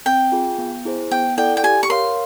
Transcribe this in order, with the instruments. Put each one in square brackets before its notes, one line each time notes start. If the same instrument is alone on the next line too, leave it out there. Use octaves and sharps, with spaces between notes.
[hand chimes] C4 [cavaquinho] G5
[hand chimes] F4 G#4
B3
E4 G#4 C5
[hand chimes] B3 [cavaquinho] G5
[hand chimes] E4 A4 D5 F#5 [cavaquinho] G5
[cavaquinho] G5
[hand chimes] G4 [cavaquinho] G#5
[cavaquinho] C#6
[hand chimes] A#4 C#5 F5 [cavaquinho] C6